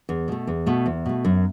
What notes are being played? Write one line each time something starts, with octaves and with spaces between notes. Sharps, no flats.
E2
B2 A3
E2
B2 A3
E2
B2 A3
F#2